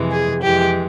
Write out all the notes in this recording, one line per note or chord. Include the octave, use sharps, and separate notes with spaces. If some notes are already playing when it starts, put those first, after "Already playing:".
Already playing: F2 C3 E3 G#3
G#4
F2 E3 G#3 G4